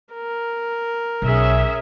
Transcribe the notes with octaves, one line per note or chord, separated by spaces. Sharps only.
A#4
B1 C#4 G#4 E5